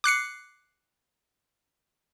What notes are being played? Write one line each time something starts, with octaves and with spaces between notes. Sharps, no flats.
D6 F#6 C7 C#7